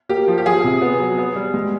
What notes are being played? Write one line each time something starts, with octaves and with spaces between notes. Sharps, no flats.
A#3 G4
F3
G4
F3 G#4
C3
B3
F#3
B3
G3
G#3